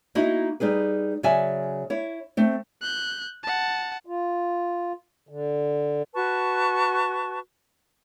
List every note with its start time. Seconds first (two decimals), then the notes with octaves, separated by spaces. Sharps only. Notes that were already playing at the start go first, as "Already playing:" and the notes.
0.15 A#3 D#4 E4 F#4 D#5
0.60 G3 D#4 G#4 B4
1.23 C#3 F#3 D5 E5 G#5
1.90 E4 C#5
2.37 A3 C4
2.81 F#6 G6
3.43 F#5 A5
4.06 F4
5.29 D3
6.14 F#4 B4 A5 C#6